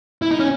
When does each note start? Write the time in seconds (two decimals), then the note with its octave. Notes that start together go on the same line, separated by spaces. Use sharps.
0.22 E4
0.31 D#4
0.40 C#4